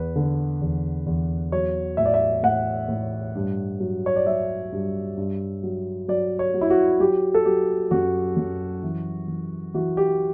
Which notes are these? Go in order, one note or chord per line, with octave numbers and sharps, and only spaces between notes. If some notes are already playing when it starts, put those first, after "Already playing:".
Already playing: E2 B4
D3
E2
E2
F#3 C#5
A2 E5
D5
E5
A2 F#5
A2
G2
F#3
C#5
D5
F#3 E5
G2
G2
F#3
F#3 D5
C#5
F#3
E4
F#4
F#3 G4
A4
F#3 G4
F#2 F#4
F#2
E3
E3
E3 F#4
G4